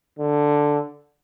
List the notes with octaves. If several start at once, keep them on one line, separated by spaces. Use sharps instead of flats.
D3